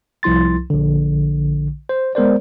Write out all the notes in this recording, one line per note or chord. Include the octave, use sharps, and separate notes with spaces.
C2 F3 E4 C6 A6
A#1 D3
C5
G#3 B3 A#4 C5 D5